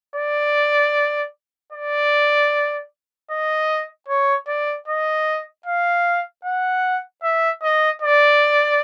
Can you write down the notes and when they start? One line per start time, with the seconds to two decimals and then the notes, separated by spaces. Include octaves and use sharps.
0.16 D5
1.73 D5
3.31 D#5
4.08 C#5
4.48 D5
4.88 D#5
5.66 F5
6.45 F#5
7.23 E5
7.63 D#5
8.02 D5